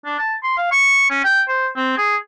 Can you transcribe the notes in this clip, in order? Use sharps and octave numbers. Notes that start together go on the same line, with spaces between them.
D4
A5
C6
F5
C#6
C#4
G5
C5
C4
G#4